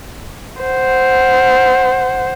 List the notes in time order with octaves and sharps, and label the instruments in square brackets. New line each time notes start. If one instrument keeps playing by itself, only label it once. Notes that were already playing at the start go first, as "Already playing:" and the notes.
[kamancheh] C5 F#5